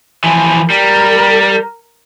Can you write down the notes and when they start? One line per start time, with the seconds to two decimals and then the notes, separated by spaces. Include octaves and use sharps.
0.24 E3 F3
0.70 G3 A#4